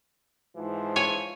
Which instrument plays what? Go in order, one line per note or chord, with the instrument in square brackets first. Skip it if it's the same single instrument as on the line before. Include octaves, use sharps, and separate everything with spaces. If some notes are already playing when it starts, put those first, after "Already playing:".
[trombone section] G#2 E3 F3
[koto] C#5 G#5